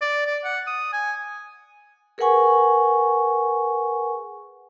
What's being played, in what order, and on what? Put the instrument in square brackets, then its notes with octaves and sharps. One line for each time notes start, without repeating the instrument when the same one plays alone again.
[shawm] D5
D5
F#5
D#6
G#5
[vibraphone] G#4 A#4 B4 F#5 G#5 C#6